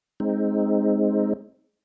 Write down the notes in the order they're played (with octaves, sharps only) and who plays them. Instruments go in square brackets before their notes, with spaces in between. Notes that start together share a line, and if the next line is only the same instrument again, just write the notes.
[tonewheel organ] G#3 C4 D#4